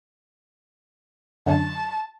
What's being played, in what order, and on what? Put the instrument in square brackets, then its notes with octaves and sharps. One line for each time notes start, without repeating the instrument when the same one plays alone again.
[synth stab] F#2 D3 [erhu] A5